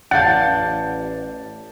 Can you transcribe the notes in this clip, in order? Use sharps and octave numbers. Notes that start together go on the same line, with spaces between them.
A1 D5 F5 F#5 A5 G6 A6